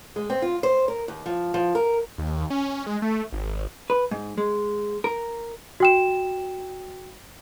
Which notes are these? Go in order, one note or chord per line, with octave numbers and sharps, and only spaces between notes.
G#3
C4
F4
C5
A#4
D#2
F3
F3
A#4
D#2
C#4
G#3
A3
G#1
B4
G#2
G#3
A#4
F#4 G5 E7